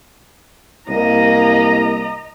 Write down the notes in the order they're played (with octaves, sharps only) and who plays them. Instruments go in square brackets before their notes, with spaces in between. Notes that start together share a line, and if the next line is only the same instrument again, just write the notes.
[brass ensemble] C2 A#3 [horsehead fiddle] D#5 A#5